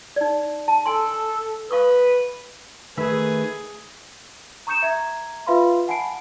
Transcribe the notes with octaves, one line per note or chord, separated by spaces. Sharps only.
D#4 D5
A5
A4 G#5 C6
B4 F5 C#6 D#6
D#3 A3 G#4 B4 E5
A#5 C#6 D#6 G6 C#7 E7
E5 A#5 G#6
F4 B4 E5 F5 B5 C6
F#5 G#5 A5 B5 C7 D7